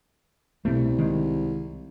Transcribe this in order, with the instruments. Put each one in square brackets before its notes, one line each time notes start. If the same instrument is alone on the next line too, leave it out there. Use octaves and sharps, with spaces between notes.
[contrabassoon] C2 [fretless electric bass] B2 A3
[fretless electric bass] D#3 G#3